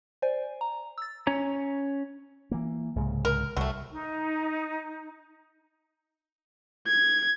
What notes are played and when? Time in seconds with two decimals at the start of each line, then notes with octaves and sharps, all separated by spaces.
0.22 C5 D5 G#5
0.61 A#5
0.98 E6 A6
1.27 C#4 C#5 A#5
2.51 E3 A#3
2.96 C2 G#2 C#3
3.25 A#4
3.57 C2 F#3 G3 A3
3.92 D#4
6.87 G#6